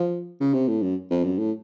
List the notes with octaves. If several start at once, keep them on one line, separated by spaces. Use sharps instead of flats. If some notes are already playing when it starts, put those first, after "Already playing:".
Already playing: F3
C#3
C3
A2
F#2
F2
F#2
A2